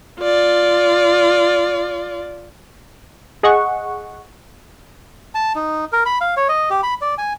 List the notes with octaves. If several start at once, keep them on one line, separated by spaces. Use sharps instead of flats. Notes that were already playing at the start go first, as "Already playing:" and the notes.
F4 D5
G#4 D#5 F#5 C#6
A5
D#4
A#4
B5
F5
C#5
D#5
G4
B5
D5
G#5